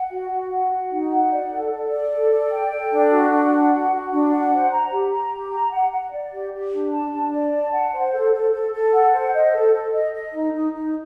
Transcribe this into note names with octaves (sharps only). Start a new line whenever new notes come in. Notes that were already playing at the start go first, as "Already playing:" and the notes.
Already playing: F#5
F#4
F#4
F#5
F#4
D#4
F#5
D5
A4
A4
D5
A4
D5
G5
A4
D4
F#4
D4
F#5
F#4
F#4
D4
F#5
C5
A#5
G4
A#5
G4
A#5
F#5
F#5
D5
G4
G4
D4
A5
D4
D5
A5
F#5
C5
A4
A4
A4
A4
F#5
C5
D#5
A4
A4
D#5
D#5
D#4
D#4
D#4